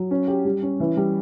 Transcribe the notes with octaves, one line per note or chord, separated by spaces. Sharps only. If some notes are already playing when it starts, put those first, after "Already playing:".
Already playing: F#3
C#4
G4
G3
C#4
E3
G3